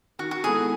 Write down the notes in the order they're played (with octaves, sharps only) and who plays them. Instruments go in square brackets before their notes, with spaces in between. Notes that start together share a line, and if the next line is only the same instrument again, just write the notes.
[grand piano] D#3 [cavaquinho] F#4
[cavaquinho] F#4
[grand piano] G#3 B3 E4 A4 [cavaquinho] G#4